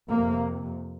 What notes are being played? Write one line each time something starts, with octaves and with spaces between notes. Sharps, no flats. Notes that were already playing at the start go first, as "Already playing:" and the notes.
F2 C3 A#3